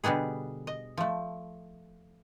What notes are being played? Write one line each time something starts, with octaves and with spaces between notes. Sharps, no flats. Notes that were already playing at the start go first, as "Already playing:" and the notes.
B2 D3 G3 B3 G#4
D#5
F3 A3